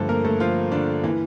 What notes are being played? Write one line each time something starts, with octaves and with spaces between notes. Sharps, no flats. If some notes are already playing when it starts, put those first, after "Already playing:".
Already playing: G2 D3 F3 A3 A4
A#3 A#4
A3 A4
F3 F4
D3 D4
E3 A#3